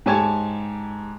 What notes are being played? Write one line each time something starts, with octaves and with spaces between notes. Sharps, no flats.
G#2 G4 C#5 G#5 A5 G#6